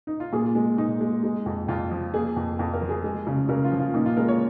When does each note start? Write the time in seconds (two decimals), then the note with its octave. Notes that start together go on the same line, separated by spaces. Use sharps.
0.07 D#4
0.20 F4
0.33 A#2 G#4
0.55 G#3
0.78 A#2 D#4
1.01 G#3
1.23 G#3
1.46 F2
1.68 F2 F4
1.91 F3
2.14 A#3 G#4
2.36 F2
2.59 F2
2.74 A#4
2.82 F3
2.89 G#4
3.04 G#3
3.27 C#3
3.49 C#3 A#4
3.64 F4
3.71 F3
3.79 F4
3.94 A#2 D#4
4.06 F4
4.17 G#3 A#4
4.28 C#5